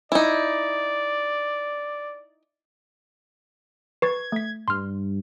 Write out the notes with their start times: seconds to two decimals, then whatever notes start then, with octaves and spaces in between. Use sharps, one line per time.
0.12 D#4 E4 D5
4.02 B4 C#6 G#6 A6
4.32 A3 B6
4.68 G2 C6 F6